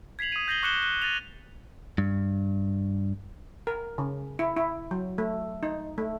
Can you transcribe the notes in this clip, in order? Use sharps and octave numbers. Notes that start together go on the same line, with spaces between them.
G#6 B6 C7 F7 F#7
D#6 D#7
G6 A#6 C7 F#7 G7
C#6 D6 F#6 C#7 E7 G7
F#6
A6 A#6 D#7 F7
G2
A#4
C#3
E4
E4
F#3
A3
D#4
A3